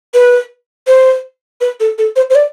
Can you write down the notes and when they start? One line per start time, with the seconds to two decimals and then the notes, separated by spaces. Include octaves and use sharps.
0.14 B4
0.87 C5
1.61 B4
1.80 A4
1.98 A4
2.16 C5
2.30 C5
2.35 D5